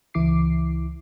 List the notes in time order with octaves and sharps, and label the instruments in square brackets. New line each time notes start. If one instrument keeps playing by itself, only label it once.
[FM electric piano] C#2 E3 E4 D6 C7